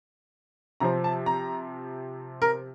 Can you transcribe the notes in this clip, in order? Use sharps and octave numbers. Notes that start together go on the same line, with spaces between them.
C3 F3 C4 A#5
A5
A#5
A#4